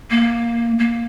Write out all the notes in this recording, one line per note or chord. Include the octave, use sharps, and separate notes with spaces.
A#3
A#3